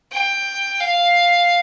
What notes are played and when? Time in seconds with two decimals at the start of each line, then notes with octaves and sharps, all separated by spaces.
0.12 G5
0.80 F5